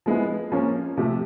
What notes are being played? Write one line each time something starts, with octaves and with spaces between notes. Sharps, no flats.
F3 G#3 B3 E4
F3 A#3 C#4
C3 F3 A3